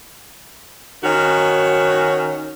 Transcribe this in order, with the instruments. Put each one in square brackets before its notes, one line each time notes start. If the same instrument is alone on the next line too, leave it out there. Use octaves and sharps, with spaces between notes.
[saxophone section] D#3 C#4 F#4